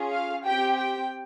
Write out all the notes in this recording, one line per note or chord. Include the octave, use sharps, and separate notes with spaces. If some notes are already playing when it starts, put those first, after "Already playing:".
Already playing: C#4 F4 G#4
F5
C4 G4 G5
G5